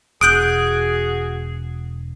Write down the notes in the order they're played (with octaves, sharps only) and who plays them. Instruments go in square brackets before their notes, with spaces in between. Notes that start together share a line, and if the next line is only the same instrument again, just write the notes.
[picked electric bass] E1 [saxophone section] F#4 G#4 [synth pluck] D#6 F#6 G6 [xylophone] D7